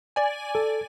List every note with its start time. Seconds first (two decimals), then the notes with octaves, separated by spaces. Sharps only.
0.16 D5 G#5
0.55 A4